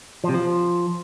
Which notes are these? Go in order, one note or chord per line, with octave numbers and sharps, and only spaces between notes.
F3
C3
F3